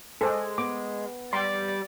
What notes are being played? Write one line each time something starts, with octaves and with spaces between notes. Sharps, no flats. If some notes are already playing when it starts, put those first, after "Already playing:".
G#3 G#4 A4 C5 D6
B3 D6
G3 D5 C6